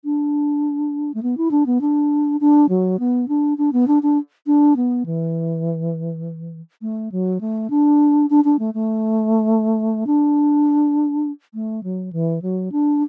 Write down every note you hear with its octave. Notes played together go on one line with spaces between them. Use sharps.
D4
A3
B3
E4
D4
B3
D4
D4
F#3
B3
D4
D4
B3
D4
D4
D4
B3
E3
A3
F#3
A3
D4
D4
D4
A3
A3
D4
A3
F#3
E3
F#3
D4